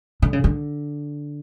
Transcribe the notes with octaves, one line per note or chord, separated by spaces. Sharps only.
D3
C#3
D3